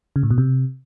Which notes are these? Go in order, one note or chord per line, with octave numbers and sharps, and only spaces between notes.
C#3
A2
B2
C3